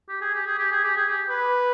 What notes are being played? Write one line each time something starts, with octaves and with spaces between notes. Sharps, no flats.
G4
G#4
G4
G#4
G4
G#4
G4
G#4
G4
B4